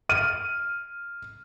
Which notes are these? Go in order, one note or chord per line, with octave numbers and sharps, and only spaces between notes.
F6 D#7